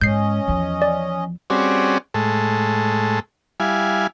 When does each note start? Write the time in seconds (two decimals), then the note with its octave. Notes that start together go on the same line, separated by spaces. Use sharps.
0.01 G#2 C#4 D#5 G6 C7
0.48 E2 F3
0.82 D5
1.50 G3 C4 C#4 F#4 G#4 D5
2.14 A2 G#3 A4
3.60 G3 E4 F5 G#5